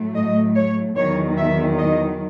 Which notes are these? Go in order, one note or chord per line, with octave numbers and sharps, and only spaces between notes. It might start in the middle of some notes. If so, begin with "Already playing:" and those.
Already playing: A2 F#3 A3
D#5
C#5
E2 D#3 F#3 C#5
E5
D#5